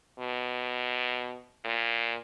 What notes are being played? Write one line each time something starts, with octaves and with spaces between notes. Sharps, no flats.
B2
A#2